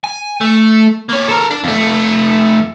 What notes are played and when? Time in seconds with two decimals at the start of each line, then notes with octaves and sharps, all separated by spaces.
0.04 G#5
0.41 A3
1.09 A#3 C#5
1.28 A4 A#4
1.51 D4 D5
1.64 F2 A3